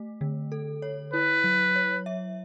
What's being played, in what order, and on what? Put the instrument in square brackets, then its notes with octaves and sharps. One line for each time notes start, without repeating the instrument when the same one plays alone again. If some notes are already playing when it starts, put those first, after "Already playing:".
Already playing: [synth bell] A3
D3
A4
C#5
[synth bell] E4 [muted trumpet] B4
[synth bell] F#3
C#5
E5